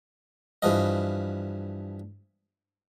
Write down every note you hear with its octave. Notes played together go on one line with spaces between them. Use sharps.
G2 E3 F3 D#5